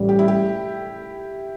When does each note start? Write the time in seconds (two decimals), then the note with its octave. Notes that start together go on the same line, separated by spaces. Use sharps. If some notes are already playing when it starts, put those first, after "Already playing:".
Already playing: A1 A2 G3
0.09 G4
0.19 E4
0.28 G4